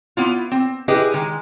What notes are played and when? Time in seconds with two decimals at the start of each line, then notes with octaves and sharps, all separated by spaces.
0.17 B3 E4 F4
0.51 C4
0.88 E4 G4 G#4 B4 D#5
1.14 D#3 G#3